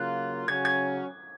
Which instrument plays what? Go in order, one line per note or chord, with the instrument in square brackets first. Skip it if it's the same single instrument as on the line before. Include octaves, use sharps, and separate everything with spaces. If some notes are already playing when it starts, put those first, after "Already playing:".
Already playing: [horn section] C#3 F#3 A#3 F4 [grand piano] F#6
[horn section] C#3 F#3 C#4 F#4 [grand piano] G#6
[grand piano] G#6